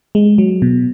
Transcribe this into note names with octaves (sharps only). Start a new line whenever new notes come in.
G#3
F#3
B2